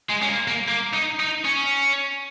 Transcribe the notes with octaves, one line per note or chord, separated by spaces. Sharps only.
G#3
C#4
A#3
A#3
A#3
D#4
D#4
C#4